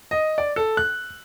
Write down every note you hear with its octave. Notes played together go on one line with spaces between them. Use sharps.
D#5
D5
A4
F#6